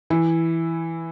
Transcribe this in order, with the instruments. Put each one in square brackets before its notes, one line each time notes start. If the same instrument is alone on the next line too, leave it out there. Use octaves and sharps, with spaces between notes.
[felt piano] E3 E4